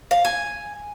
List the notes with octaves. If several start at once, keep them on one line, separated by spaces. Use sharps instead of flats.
F5
G#5